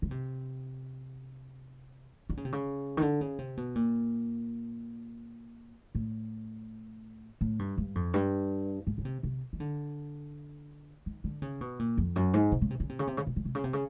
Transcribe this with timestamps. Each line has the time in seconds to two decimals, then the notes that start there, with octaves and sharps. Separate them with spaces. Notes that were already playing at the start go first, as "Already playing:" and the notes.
0.02 C#3
0.11 C3
2.30 D3
2.37 C#3
2.45 C3
2.52 C#3
2.97 D#3
3.02 D3
3.21 C#3
3.39 C3
3.57 B2
3.75 A#2
5.95 A2
7.41 A2
7.59 G2
7.77 G2
7.95 F2
8.14 G2
8.87 G#2
8.98 C#3
9.05 C3
9.23 C3
9.53 D#3
9.60 D3
11.06 D#3
11.24 D3
11.42 C#3
11.61 B2
11.79 A#2
11.98 F2
12.16 F#2
12.34 G#2
12.52 C3
12.61 C#3
12.70 C3
12.80 C#3
12.89 C3
12.99 C#3
13.07 C3
13.17 C#3
13.27 C3
13.36 C#3
13.45 C3
13.55 C#3
13.64 C3
13.73 C#3